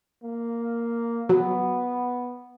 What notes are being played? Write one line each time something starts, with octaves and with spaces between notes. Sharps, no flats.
A#3
F#3 B3